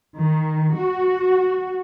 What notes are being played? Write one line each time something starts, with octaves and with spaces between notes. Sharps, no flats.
D#3
F#4